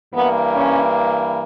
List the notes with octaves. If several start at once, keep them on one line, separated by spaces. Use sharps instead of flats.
G2 E3 A#3 B3
C#4